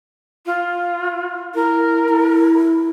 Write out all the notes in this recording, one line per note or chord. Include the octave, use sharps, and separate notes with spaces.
F4
E4 A#4
E4